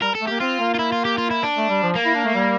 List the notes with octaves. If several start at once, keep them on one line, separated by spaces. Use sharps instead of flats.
G3 A#4
A4
A3
A#3 G4
C4 F4
A#3
F4
E4
F4
G4
F4
E4
D4
A3
G3
F3
A#3
E4
D4
A3
G3